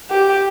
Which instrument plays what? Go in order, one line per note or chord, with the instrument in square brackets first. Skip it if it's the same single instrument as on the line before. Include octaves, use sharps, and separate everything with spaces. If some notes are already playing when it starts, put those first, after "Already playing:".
[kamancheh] G4